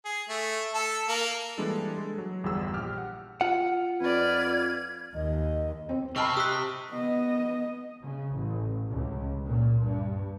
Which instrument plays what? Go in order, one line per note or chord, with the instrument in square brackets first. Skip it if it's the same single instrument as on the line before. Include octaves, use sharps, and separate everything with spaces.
[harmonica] G#4
A3
A4
A#3
[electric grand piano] E3 G3 G#3 A#3 D4 A4
G#3 A4
F#3
G1 E2 G3 G#4 F#5 E6
A#1 G4 F6
F#5
[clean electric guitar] F4 F#5
[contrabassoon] F2 [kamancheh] B4 D5 [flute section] F6 G#6
[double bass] D#2 [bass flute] D#5
[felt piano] C4 C5
[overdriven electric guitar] C3 C4 [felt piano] D#5 A5 B5 [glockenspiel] C#6 F6
[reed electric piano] G4 F#6 [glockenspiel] D#6 B6
[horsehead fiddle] B3 D#5
[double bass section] C#3
A1
C#2
A#2
G2